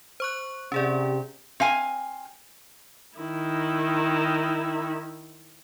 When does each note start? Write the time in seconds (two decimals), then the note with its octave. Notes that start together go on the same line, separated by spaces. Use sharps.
0.20 C5 C#6 F#6
0.72 C3 C#4 G#4 D5
1.60 C4 F5 G#5
3.18 D#3 E4